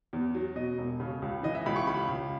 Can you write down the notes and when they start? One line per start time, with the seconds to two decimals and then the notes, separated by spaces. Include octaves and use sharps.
0.13 E2
0.35 F#3
0.56 B2 D#5
0.78 E1
1.00 C#3
1.22 C#2
1.43 E3 D#5
1.55 E5
1.66 C#2 B5
1.76 C#6
1.87 C#3 B5
2.09 C#2